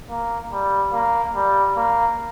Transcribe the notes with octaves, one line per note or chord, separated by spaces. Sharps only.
A#3
G3
A#3
G3
A#3